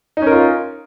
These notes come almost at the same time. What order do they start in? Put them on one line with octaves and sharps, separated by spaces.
D#4 C#4 A#4 F4